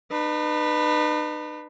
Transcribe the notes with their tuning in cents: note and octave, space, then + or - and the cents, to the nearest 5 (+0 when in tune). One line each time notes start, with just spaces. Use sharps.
D#4 -45 B4 +0